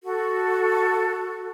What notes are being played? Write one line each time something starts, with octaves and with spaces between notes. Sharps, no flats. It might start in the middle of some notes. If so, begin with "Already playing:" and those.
F#4 A4